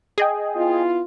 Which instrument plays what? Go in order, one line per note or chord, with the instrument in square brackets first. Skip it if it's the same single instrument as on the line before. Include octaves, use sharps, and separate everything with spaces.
[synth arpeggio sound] G#4 D#5 G5
[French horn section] B3 E4 F4